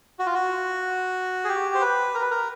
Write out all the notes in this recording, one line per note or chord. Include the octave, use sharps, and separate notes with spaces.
F#4
F4
F#4
G#4
G4
C5
B4
A#4
B4
A#4